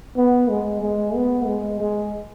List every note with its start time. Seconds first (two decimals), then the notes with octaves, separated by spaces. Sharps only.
0.17 B3
0.49 G#3
0.82 G#3
1.15 B3
1.46 G#3
1.80 G#3